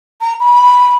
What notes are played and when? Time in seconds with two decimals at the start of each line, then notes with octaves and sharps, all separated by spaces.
0.21 A#5
0.40 B5